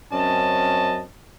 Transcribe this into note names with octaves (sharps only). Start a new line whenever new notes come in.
F#2 C4 C#4 D#5 A5